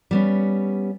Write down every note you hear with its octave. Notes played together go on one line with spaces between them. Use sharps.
G3 B3 C#4